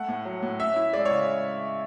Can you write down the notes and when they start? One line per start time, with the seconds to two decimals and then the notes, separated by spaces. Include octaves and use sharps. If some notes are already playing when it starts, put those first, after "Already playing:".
Already playing: A3 F#5
0.08 A2
0.25 F#3
0.42 A2
0.60 C#4 E5
0.76 E4
0.93 G#3 D5
1.05 C#5
1.11 C#3